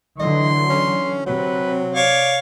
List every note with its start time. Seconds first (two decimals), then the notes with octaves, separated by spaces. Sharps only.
0.20 D3 E3 F#3 D#5 C6
0.69 C#4
1.26 C3 F#3 C4 B4
1.95 C#5 D5 F5